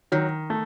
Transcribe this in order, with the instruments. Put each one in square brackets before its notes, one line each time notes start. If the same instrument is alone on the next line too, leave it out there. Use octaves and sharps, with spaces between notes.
[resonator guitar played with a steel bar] D#3 [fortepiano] F#3
[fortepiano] A3